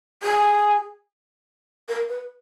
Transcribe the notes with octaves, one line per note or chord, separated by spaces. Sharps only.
G#4
A#4
B4